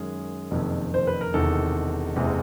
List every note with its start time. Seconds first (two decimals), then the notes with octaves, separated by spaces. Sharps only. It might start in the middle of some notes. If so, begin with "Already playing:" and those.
Already playing: F#2 D#3 G#3 C#4 G#4
0.51 F#1 F2 C3 D#3
0.94 C5
1.07 B4
1.21 A#4
1.34 E1 E2 C3 D#3 A4
2.16 F#1 E2 C3 E3 G#3